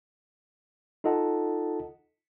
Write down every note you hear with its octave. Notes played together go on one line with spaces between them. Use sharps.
D#4 F4 A4 D#5 F#5 A5